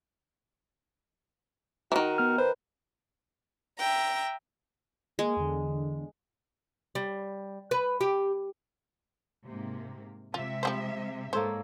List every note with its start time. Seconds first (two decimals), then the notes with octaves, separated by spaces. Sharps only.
1.92 D#3 E3 F#4
2.18 B3 F6
2.38 B4 C5
3.78 E5 G5 A#5
5.19 G#3 A#3
5.36 E2 D3
6.95 G3
7.71 B4
8.01 G4
9.47 G#2 C3 A#3
10.34 C3 G#3 F4 E5
10.63 F3 G3 C5
11.33 G#2 A#3 A4 C5 C#5